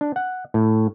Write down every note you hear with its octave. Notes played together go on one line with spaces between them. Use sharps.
D4
F#5
A2